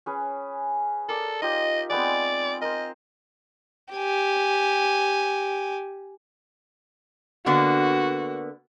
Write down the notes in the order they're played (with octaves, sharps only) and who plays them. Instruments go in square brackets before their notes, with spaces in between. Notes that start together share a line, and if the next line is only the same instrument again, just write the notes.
[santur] C#4 G#4 B4
[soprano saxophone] A4 [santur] A#4 D5
[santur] D#4 F4 G4 [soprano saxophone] D#5
[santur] G#3 B3 C4 [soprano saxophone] D5
[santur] A#4 C5 [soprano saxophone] D#5
[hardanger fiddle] G4 G#5
[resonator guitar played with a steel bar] D3 A#3 B3 [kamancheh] F#4